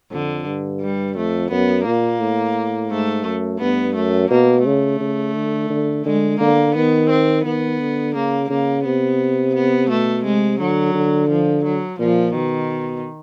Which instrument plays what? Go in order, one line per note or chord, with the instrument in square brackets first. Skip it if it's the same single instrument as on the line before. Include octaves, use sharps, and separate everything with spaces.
[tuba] F2 [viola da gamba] D3
[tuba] G2
[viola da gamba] G3
[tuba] F2 [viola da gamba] A3
[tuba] F#2 [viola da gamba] B3
[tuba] A#2 [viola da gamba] A#3
[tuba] A2
[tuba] G#2 [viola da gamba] A3
[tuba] F#2
[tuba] G2 [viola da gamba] B3
[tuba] F#2 [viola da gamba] A3
[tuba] B2 [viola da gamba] A#3
[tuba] C#3 [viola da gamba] A3
[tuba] C#3
D3
D3
[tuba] D3 [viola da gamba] G#3
[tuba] D3 [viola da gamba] A#3
[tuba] D#3 [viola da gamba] B3
[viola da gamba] C4
[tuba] D#3 [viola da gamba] B3
[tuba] D3
[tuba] C#3 [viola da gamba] A#3
[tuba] C#3 [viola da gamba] A#3
[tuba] C3 [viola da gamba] B3
[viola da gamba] B3
[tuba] B2 [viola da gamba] A3
[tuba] C3 [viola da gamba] G#3
[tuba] D3 [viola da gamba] F#3
[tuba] D3
[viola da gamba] F3
F#3
[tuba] A#2 [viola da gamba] F3
[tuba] B2 [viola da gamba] D#3